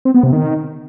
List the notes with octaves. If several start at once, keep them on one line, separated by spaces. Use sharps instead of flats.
C4
B3
C3
D#3